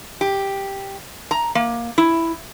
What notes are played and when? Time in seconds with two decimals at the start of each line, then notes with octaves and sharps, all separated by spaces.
0.21 G4
1.31 A#5
1.55 A#3
1.98 E4